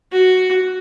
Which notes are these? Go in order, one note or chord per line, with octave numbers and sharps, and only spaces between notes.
F#4